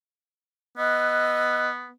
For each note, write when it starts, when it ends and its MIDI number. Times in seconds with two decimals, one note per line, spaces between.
0.77 1.91 59
0.77 1.69 75
0.77 1.69 88
0.77 1.69 90